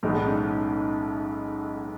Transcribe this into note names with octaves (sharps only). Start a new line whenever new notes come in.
B1 A2 E3 G#3 B3 D#4
D4
C#4 D#4